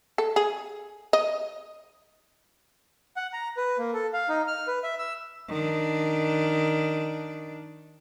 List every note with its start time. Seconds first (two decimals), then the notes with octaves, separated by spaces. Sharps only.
0.18 A4
0.36 G#4
1.13 D#5
3.16 F#5
3.33 A#5
3.57 B4
3.78 A#3
3.93 A4
4.13 F5
4.29 D#4
4.47 F6
4.67 B4
4.83 E5
4.99 E6
5.49 D#3 D4